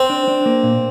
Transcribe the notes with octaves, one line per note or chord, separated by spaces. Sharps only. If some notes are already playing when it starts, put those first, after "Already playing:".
Already playing: C4
D4
D4
A#3
A#2